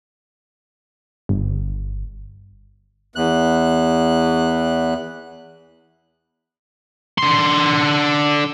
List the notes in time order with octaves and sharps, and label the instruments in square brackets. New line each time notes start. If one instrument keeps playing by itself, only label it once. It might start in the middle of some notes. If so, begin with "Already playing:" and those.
[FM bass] G1
[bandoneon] E2 F#6
[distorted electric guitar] D3 C6